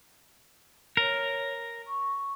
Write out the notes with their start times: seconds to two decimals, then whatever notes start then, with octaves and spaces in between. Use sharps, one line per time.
0.97 A#4 C#5
1.87 C#6